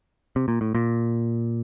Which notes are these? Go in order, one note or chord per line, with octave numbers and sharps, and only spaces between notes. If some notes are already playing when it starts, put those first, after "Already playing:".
C3
A#2
A2
A#2